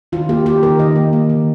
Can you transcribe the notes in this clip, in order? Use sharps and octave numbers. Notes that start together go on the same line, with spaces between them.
D#3 F4
A#3 G4
A#3 G4
D#3 A#4
D#3 D#5
A#3
A#3
D#3